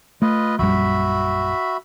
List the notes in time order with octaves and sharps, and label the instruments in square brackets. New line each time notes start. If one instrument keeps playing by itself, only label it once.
[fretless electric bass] A3 [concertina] F4 B4 D#5
[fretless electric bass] A#1 F#2 G3 [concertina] F#4 E5 B5